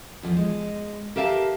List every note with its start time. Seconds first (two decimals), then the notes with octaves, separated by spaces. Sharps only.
0.23 E2 F3
0.37 G#3
1.16 G4 A#4 E5 F5 G5 A5